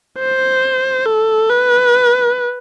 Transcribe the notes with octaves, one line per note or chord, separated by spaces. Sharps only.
C5
A4
B4